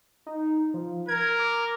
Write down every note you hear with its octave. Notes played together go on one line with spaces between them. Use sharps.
D#4
F3
A#4 G#6
D6